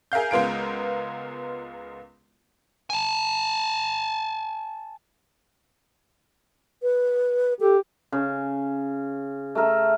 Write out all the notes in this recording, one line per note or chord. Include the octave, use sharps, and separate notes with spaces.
G#4 A#4 E5 F5 G6
C#2 G#3 B3 F4 A#4 D7
G#5 A5
B4
G4 A4
C#3
A3 A4 A#4 E5